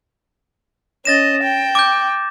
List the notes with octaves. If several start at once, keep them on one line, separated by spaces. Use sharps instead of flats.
C#4 D#5 A6 A#6 E7
G5
D6 G6